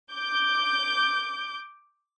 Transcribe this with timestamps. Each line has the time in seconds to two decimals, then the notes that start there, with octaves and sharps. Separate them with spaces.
0.13 D6 G6